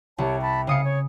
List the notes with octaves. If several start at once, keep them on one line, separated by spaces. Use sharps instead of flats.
C2 G4 C#5 A5
A5 B5
C#3 F5 D#6 C#7
C#5